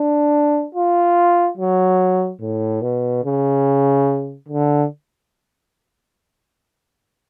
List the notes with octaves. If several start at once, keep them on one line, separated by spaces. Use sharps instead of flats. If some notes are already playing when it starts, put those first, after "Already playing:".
Already playing: D4
F4
F#3
A2
B2
C#3
D3